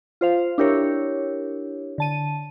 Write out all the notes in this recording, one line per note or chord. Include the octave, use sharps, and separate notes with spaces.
F4 C5 F5
D4 E4 G4 A#4 C#5
D3 A5 D#7